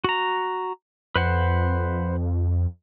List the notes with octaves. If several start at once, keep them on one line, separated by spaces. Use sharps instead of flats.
F#4 A#5
F2 B4 C5 F#5